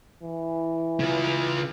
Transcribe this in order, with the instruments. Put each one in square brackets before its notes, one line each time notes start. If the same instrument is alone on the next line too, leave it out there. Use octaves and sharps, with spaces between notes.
[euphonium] E3
[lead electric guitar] C#3 F4